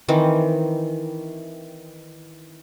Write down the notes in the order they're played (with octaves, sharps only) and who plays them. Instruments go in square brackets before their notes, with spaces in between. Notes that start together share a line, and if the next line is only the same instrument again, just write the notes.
[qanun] D#3 E3 C4